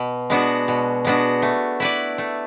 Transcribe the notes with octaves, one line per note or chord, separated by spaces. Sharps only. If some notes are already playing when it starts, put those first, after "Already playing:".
Already playing: B2
G#3 B3 D4 F#4
B2
G#3 B3 D4 F#4
A3
E4 B4 D5
A3